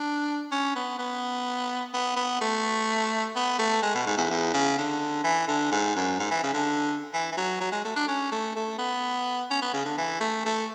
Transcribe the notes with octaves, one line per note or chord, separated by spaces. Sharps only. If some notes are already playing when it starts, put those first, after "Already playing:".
Already playing: D4
C#4
B3
B3
B3
B3
A3
B3
A3
G#3
B2
G#2
E2
E2
C#3
D3
E3
D3
G#2
F#2
G#2
E3
C#3
D3
E3
E3
F#3
F#3
G#3
A3
D4
C#4
A3
A3
B3
C#4
B3
C#3
D3
E3
A3
A3